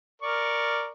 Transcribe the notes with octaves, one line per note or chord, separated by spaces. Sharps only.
A#4 D5 C#6